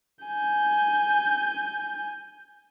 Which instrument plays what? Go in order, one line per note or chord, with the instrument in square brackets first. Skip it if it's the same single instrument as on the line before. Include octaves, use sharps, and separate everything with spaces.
[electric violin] G#5 G6